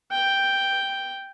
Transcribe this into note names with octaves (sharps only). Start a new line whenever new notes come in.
G5